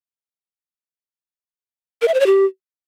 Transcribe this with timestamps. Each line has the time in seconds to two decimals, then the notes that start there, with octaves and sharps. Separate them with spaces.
2.02 A#4
2.08 E5
2.14 C5
2.20 C#5
2.26 G4